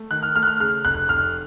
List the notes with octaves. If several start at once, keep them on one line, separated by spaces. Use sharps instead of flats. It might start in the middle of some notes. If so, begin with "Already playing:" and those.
Already playing: A3
D#3 F#6
F6
A3 F6
F#6
F6
C#3 F6
F1 F#6
F1 F6